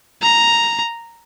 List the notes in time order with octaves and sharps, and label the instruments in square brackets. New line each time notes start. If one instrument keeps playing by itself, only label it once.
[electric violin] A#5